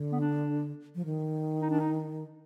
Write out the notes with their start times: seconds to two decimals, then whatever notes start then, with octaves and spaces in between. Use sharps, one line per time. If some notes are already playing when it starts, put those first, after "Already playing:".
Already playing: D3
0.12 B3
0.21 D4
0.95 F3
1.05 D#3
1.62 D#4
1.71 D4
1.80 D#4